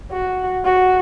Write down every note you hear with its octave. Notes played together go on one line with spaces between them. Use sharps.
F#4
F#4